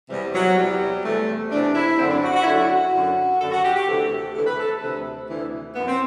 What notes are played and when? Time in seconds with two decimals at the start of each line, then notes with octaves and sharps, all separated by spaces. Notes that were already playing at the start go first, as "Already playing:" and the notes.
0.09 E2 C3 E3 G3
0.33 F#3
0.56 E2 C3 E3 G3
1.04 E2 C3 E3 A3
1.51 E2 C3 E3 D4
1.74 E4
1.98 F#2 D3 C4
2.10 D4
2.22 F#4
2.33 F#4
2.42 E4
2.45 F#2 D3 F#4
2.92 F#2 D3
3.39 F#2 D3 A4
3.51 F#4
3.63 G4
3.75 G4
3.87 D2 C3 E3 A4
4.34 D2 C3 E3 A4
4.46 B4
4.58 A4
4.81 D2 C3 E3
5.28 D2 C3 E3
5.75 F#2 E3 B3
5.87 C4